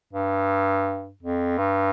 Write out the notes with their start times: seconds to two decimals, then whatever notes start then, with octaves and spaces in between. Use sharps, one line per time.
0.13 G2
1.23 F2
1.58 G2